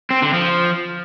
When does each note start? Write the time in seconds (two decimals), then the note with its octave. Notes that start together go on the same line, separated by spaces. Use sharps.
0.11 C4
0.22 D3
0.34 F3